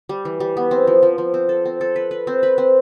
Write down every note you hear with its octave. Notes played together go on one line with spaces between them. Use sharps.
G3
E3
G3
B3
C4
F3
F3
F3
C4
A4
C4
A4
B4
B4
C4
B4
C4